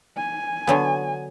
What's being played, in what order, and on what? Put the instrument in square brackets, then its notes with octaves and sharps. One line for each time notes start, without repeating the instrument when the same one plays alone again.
[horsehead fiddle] G#5
[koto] D3 F#3 B3